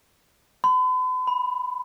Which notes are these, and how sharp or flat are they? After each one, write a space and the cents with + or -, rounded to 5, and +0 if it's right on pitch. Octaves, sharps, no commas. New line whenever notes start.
B5 +45
B5 +0